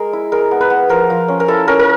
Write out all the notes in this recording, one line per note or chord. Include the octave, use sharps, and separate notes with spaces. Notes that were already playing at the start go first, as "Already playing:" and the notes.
Already playing: G#3 A#4
E4
G#3 A#4
B3
B4
B3
F3 A#4
F3
C#4
A#4
E4 A4
C#4 A#4
A#4